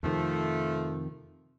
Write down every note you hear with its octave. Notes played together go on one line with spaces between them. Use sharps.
F2 C3 D#3 F3 A3